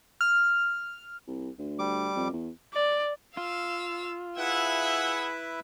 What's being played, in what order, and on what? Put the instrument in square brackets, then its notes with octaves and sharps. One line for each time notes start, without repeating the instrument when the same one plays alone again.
[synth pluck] F6
[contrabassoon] C2
D2
[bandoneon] G3 D6
[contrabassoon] F2
E2
[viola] D5
[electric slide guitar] F4 [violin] F5 E6
[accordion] E4 B4 E5 [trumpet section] G#4 F#5 [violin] E6 G#6